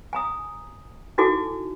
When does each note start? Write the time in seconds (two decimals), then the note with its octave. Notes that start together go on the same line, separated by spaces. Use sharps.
0.13 G#5 A#5 D#6
1.18 D#4 E4 F#4 A4 G#5 D6